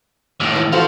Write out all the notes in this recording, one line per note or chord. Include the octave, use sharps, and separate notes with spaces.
D#2 A2
E3
F3 F4 F#4 A4 C5